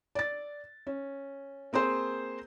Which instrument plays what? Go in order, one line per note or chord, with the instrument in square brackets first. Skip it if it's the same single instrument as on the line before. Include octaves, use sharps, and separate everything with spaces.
[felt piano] D5 A6
C#4
A#3 C4 G#4 C5